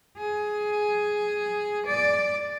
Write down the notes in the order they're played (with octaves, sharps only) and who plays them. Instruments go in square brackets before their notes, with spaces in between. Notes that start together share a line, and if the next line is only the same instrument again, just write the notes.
[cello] G#4
D5